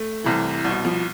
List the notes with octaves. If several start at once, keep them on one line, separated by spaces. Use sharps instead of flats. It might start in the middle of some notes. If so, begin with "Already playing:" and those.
Already playing: A3
C2 C3 E3
C2 B2
F3